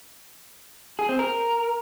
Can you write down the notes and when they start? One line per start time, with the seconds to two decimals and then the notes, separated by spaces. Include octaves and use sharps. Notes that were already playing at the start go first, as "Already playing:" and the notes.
0.99 G#4
1.09 C4
1.19 A#4